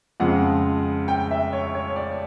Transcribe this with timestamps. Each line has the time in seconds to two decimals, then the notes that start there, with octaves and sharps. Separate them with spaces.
0.20 F2 C#3 F3 G#3 F#5
1.08 G5
1.31 E5
1.53 C#5
1.74 C#5
1.96 D5